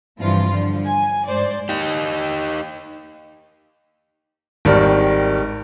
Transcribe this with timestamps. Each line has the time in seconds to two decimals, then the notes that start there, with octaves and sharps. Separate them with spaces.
0.20 G2 C3 E3 F3 F4
0.50 D3 F3 G3
0.85 G#5
1.28 G#2 C5 D5
1.69 D#4 G4
4.65 G#1 D#3 G3